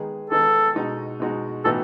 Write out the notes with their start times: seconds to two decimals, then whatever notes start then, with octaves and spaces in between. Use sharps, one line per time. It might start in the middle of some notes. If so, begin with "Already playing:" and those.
Already playing: D#3 G#3 B3 D#4 G#4
0.29 D#3 G#3 B3 D#4 G#4 A4
0.75 B2 G#3 D#4 F#4
1.20 B2 G#3 D#4 F#4
1.64 A2 E3 B3 D#4 F#4 A4